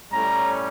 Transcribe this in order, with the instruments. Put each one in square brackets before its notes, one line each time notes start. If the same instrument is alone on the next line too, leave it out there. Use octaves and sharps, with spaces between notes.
[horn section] A2 G3 C#4 A#5